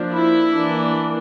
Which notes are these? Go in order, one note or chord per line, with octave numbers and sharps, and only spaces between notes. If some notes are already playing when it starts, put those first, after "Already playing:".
Already playing: F3 A#3 D4
E4
E3 A#3 D4